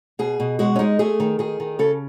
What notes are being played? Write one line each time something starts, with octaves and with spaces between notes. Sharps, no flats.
B2 G#4
B2
G#3 F#4
C#4
G#3 D#4
A3 G#4
D#3
D#3 G#4
D#3
C#3 A4